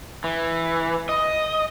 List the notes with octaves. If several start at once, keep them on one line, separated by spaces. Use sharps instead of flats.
E3
D#5